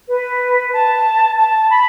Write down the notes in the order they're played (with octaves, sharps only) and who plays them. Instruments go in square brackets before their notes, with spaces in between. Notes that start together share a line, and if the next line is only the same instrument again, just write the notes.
[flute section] B4
A5
A5
B5